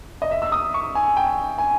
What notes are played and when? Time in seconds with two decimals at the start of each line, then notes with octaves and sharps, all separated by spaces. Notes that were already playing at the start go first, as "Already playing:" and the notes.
0.22 D#5
0.31 E5
0.42 E6
0.52 D#6
0.74 C#6
0.95 G#5
1.17 G5
1.58 G#5